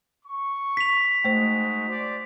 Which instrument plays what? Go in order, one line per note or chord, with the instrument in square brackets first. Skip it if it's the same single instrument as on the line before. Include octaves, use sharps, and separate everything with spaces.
[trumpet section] C#6
[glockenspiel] B6 F7
[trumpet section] G#3 D#4 F#4 [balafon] A3 C5
[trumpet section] C5 D5